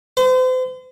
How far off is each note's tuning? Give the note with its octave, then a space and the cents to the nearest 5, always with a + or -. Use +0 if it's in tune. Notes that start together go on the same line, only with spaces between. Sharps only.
C5 -40